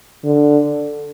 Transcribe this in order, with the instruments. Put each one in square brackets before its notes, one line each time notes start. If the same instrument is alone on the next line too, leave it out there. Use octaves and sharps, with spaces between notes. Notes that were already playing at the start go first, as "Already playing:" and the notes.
[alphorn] D3